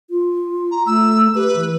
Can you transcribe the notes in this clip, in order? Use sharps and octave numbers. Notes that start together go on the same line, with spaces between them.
F4
A#5
A3 E6
G4 B4
E3